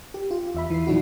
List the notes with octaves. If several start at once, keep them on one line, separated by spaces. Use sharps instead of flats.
G4
F4
E2 E5 B5
E3 C7
A#2 F3 F#3 D4 D#4 F#4